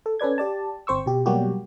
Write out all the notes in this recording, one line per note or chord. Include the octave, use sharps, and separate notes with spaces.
A4
C#4 A4 B4 D5 G#6
G4 D5 A5
G1 C4 C5 C#6 E6
B2 G4
B2 F#3 G3 A#3 F#4 G4